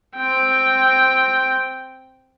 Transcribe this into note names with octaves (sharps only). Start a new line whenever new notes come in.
C4 G5